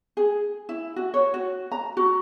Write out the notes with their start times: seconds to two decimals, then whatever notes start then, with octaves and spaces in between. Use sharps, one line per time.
0.17 G#4
0.69 E4
0.96 F#4
1.14 C#5
1.34 F#4
1.72 A#5
1.97 F#4